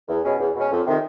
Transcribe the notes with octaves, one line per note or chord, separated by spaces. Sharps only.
E2
B2 G#3 C#4
E2
B2 G#3 C#4
F2
C3 D#3